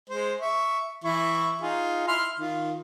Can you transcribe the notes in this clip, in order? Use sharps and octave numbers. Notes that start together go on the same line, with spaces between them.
G#3 C5
E5 C#6
E3 E4 C#6
D#4 F4 G#4
E4 C6 F6
D#3 F4